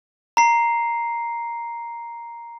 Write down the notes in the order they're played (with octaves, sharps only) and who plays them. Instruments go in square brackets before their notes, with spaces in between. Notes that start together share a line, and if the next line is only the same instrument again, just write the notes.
[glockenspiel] A#5 C7